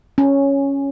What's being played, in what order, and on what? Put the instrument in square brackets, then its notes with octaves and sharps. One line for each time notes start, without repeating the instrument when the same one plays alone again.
[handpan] C#4